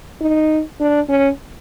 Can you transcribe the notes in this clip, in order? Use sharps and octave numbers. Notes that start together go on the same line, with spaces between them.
D#4
D4
C#4